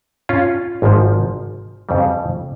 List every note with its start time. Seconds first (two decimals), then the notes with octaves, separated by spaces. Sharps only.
0.29 C#4 F4
0.82 G#1 G#2 F3
1.89 F2 C#3 G3